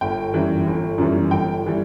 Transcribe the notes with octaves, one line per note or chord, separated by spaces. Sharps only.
G1 G5
F#2 E3 G3
G1
F#2 E3 G3
G1 G5
E3 G3